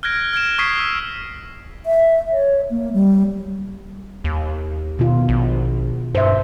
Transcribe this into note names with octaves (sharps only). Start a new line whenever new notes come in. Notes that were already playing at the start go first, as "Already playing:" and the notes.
F6 F#6 G#6 A#6 D7
F6 G#6 D7 E7
C#6 D#6 G#6 B6 C7
D#6 E6
E5
C#5
A#3
G3
D#2
B2 D#3 F4
A#1
G2 C5 E5